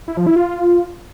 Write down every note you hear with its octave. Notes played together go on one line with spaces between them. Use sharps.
E4
F3
E4
F4